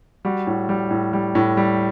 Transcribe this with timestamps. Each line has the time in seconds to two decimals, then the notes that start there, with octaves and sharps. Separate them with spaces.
0.25 G3 F#4
0.47 A2
0.69 G3
0.91 A2
1.13 G3
1.35 A2
1.57 G3